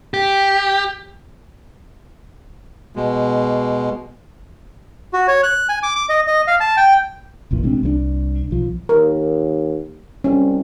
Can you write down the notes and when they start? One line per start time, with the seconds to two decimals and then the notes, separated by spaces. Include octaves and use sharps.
0.14 G4
2.96 B2 G#3
5.13 F#4
5.28 C#5
5.43 F#6
5.69 G#5
5.83 D6
5.96 D6
6.09 D#5
6.27 D#5
6.48 F5
6.60 A5
6.77 G5
7.51 F1 A#1 A#2 E3
7.63 C3 G#3 C4 D4
7.83 C2 F#3 D4
8.51 B1 F3
8.89 D#2 A#4
10.24 C2 C#4